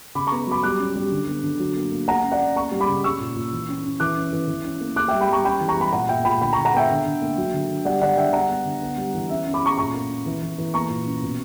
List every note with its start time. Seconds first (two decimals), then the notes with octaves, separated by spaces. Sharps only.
0.15 C#3 B5 D6
0.27 B3 A#5 C#6
0.47 F#3 B5 D6
0.63 G3 D6 F#6
0.79 C#4
0.96 G3
1.12 D3
1.28 B3
1.43 D3
1.60 F#3
1.76 A#3
1.92 A#3
2.08 A#3 F#5 A#5
2.24 C#4
2.32 D5 F#5
2.40 C#4
2.56 A#3 A#5 C#6
2.72 G3
2.81 B5 D6
2.89 C#3
3.04 C#4 C#6 E6
3.20 A#2
3.36 A#2
3.52 E3
3.68 C#4
3.84 C#4
4.00 E3 D6 F#6
4.16 C#4
4.32 E3
4.48 E3
4.65 C#4
4.81 A#3
4.96 A#3 D6 F#6
5.08 E5 G5
5.13 G3
5.21 G5 B5
5.28 G3 A#5 C#6
5.45 C#4 G5 B5
5.60 E3
5.69 A#5 C#6
5.77 G3 G5 B5
5.93 A#2 F#5 A#5
6.09 A#2 E5 G5
6.25 A#2 G5 B5
6.41 D3 G5 B5
6.53 D3 A#5 C#6
6.65 F#5 A#5
6.73 B3 E5 G5
6.90 D3
7.06 D3
7.22 A#3
7.38 F#3
7.54 D3
7.69 D3
7.85 G3 D5 F#5
8.01 D3 D5 F#5
8.17 D3 E5 G5
8.33 G3 F#5 A#5
8.49 B3
8.65 D3
8.82 B3
8.98 G3
9.14 E3
9.29 C#4 E5
9.46 C#4
9.54 B5 D6
9.62 C#4 A#5 C#6
9.77 A#2 A#5 C#6
9.94 A#3
10.10 C#4
10.26 E3
10.42 E3
10.58 E3
10.74 A#3 A#5 C#6
10.90 A#2
11.06 C#4
11.22 B2